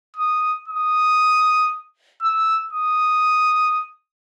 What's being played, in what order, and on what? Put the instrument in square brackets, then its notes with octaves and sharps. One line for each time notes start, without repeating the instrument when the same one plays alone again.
[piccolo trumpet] D#6
D#6
E6
D#6